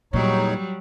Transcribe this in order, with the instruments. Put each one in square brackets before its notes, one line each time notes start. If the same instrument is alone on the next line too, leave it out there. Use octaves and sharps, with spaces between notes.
[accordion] E2 D#4 C#5 [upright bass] A#2 [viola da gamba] F#3 G3